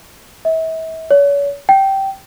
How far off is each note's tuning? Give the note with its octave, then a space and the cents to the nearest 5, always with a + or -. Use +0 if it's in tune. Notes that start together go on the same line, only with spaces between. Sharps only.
E5 -40
C#5 +35
G5 -10